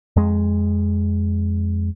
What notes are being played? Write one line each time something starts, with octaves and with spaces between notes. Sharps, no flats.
F2 G#3